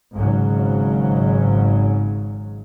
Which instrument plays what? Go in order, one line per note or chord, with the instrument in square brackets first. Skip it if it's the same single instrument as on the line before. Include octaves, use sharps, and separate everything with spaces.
[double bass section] G#1 G#2 C#3 F#3